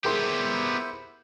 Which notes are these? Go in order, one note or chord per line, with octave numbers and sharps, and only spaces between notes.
B3 E4 G4 G#4 A#4 C5 C6